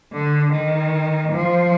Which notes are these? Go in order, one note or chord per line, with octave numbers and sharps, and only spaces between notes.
D3
D#3
F3